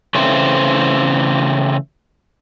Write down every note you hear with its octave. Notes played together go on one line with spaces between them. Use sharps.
C#3 E3 A3 C4 C5